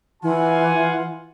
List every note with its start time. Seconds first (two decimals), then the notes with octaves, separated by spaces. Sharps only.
0.23 E3 F4 F#5 G#5